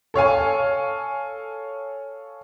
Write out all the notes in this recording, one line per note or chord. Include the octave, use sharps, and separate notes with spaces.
A4 C#5 F5 G#5